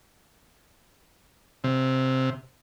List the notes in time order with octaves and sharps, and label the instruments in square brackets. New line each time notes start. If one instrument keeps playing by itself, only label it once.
[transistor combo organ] C3